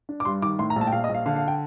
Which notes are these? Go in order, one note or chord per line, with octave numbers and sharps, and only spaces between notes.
D4
D6
G2 C6
D#3 D6
A2 C6
A#5
A#1
A5
G5
A#1 F5
D#5
A#1
F5
D3 F5
F5
G5